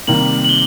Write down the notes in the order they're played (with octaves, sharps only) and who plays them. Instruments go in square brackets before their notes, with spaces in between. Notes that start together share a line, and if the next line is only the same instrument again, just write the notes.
[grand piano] C3 D#3 G3 A#3 [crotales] F#7
[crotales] F#7
G7